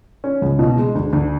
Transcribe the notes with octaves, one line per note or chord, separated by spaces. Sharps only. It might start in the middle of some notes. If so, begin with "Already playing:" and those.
C#4
C#2
B2
G#3
D2
D2